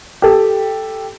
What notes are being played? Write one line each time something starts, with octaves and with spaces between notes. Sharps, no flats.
G4 A4